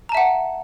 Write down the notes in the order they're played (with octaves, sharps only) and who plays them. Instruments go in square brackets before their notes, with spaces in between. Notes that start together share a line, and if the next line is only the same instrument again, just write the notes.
[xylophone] A#5
A5
E5
F#5